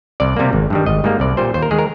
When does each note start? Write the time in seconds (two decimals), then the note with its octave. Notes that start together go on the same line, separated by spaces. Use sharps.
0.20 C2 D5
0.36 C3 G3 A#3
0.53 G#1
0.70 G2 D#3 G3
0.86 G#1 D#5
1.04 G#2 G3 A#3
1.20 C2 D5
1.37 A#2 G3 C5
1.54 D#2 C5
1.62 A#4
1.71 D#3 G#3 G#4
1.79 A#4